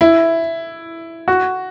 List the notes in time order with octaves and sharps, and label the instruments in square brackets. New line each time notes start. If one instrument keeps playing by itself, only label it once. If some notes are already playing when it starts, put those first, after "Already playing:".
[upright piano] E4
F#4